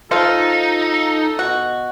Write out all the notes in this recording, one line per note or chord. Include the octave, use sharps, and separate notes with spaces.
F3 D#4 F4 A4 F5
B2 F#4 D#5